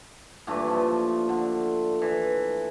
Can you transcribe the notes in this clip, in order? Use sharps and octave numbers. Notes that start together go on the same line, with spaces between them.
G2 A#2 E3 A3
F3
D3
E3